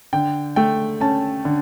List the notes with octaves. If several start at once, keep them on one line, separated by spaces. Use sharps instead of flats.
D3 G5
A3 G5
C#4 A5
D3